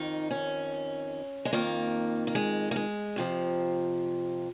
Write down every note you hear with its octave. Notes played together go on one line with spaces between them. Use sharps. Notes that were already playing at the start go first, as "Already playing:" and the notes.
Already playing: F2 D#3 D#4
C#4
G#3
F2 D#3 A#3
A#3
G#3
A#3
G#3
F2 C3 F3